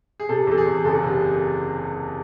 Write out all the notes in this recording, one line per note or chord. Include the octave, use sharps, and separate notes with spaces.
G#4
C3 A4
E2 A4
G#4
E2
F#1 A4
C3